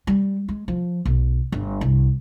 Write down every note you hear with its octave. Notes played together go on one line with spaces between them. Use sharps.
G3
G#3
F3
B1
G1
C2